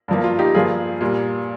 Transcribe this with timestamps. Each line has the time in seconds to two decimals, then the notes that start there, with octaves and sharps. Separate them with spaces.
0.08 G2 F3 A#3
0.24 F4
0.39 D#4 G4
0.54 G2 F3 A#3 F4 G#4
1.01 A#2 G3 A#3